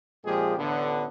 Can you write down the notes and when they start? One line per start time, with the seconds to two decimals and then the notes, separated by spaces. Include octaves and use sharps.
0.25 F2 A#2 F3 G#3 G4 G#4
0.57 A1 D3 B3